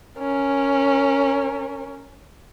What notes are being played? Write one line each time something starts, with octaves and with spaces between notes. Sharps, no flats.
C#4 A#4